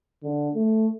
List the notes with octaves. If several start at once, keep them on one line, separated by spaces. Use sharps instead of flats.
D3
A3